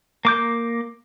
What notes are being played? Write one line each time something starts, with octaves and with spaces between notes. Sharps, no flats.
A#3 D6 G6